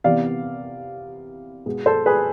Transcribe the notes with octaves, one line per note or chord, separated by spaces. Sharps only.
C3 E3 B3 D5 F5
B2 G#3 B3
A4 C5
G#4 B4